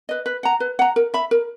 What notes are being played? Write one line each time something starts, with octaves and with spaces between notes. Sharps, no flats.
B4 D#5
B4
F#5 A#5
B4
F#5 A#5
A#4
E5 B5
A#4